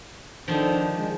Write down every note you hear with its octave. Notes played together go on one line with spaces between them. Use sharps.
D3 D#3 F3
D4
G#3